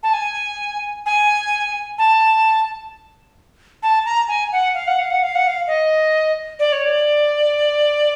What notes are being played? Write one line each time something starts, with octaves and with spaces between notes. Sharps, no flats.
A5
G#5
G#5
A5
A5
A#5
G#5
F#5
F5
F#5
F5
F#5
F5
F#5
F5
D#5
D5
C#5
D5